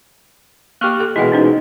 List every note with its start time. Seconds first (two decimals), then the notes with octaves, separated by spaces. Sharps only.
0.81 A#3 G4 C#6 F6 F#6
1.00 A4
1.16 B2 E3 G#3 E4 F#5 G5
1.32 C#4 D#4 C5